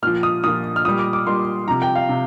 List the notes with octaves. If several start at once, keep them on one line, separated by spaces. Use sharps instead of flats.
A#2 F3 F6
D#6
A#2 F3 D#6
F6
A#2 G3 D#6
D6
D6
A#2 G3 C6
C3 F3 A#5
G5
F5
C3